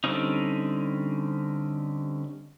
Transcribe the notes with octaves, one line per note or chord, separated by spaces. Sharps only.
D3 G3 C4 C#4 D#4